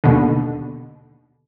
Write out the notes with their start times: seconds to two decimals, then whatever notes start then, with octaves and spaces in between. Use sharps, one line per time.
0.04 D#2 B2 D3